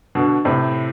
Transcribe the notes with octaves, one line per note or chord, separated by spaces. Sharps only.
B2 D3
A2 C3